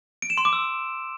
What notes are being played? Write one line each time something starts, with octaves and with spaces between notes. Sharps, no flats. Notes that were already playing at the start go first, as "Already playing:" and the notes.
D7
E7
C6
D6
E6